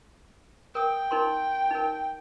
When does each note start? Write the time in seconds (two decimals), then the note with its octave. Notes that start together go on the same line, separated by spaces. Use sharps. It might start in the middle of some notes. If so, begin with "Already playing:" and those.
0.75 A#4 G5 D#6
1.11 D#4 A#4 C6
1.71 D#4 A#4